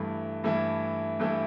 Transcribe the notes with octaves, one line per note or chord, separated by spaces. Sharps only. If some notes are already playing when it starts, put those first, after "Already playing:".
Already playing: G2 E3 A3 E4
G2 E3 A3 E4
G2 E3 A3 E4